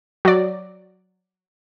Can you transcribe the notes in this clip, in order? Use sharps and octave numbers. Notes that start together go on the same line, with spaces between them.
F#3 D5